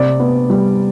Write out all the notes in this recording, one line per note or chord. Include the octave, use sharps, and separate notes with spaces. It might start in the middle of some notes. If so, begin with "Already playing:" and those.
Already playing: C3 D5
B3
G3